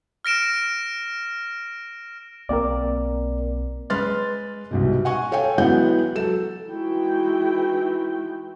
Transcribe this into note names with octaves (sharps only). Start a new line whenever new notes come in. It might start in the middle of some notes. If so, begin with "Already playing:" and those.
F6 A#6 D7 E7
B1 A#3 C4 A#4 D5
G#3 B4 C6 F6 A6
C2 G#2 B2
F#5 G#5 C#6
A4 C#5 F5 G5 G#5
E3 F#3 G#3 B3 F#5 G6
F#3 A4 E7
E3 G#3 D#4 E4 F#4 G5